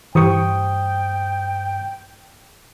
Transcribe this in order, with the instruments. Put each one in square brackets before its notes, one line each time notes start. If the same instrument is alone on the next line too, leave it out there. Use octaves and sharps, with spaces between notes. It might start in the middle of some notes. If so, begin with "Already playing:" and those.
[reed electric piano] G2 C5 D#6 [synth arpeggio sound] E3 G4 C#6 [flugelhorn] G5